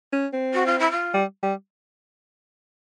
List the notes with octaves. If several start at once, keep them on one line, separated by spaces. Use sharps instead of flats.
C#4
C4
F#4
F4
E4
F4
G3
G3